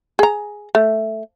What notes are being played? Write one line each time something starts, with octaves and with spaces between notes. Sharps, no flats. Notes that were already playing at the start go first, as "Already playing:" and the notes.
G#4 A#5
A3